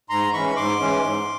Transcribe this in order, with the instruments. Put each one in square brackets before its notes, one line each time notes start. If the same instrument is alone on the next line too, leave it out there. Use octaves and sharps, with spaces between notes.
[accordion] G#2 A#5 C6
E3 G#3 C#4 B5 C#6
G#2 C6 D6
E3 G#3 C#4
G#2